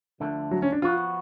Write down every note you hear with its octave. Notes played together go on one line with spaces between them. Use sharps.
D2 D3 F3 A3
F#3
C#4
D4
F3 B3 F4 F#4